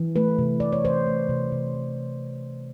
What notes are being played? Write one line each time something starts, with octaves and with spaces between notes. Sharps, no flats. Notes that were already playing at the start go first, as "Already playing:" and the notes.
Already playing: E3
A3 B4
C3
C3 D5
C#5
E3 C5
A3
C3
C3
E3